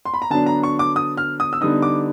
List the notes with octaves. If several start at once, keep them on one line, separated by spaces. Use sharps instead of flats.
C6
B5
A#5
D3 F#3 B3 D4 A5
A#5
C#6
D6
D#6
F6
D#6
E6
D3 G3 B3 D#4 D#6
D6